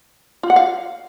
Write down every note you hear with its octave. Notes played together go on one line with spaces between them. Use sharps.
F4
F#5
F5